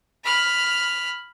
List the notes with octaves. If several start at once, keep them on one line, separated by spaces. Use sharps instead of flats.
B5 F6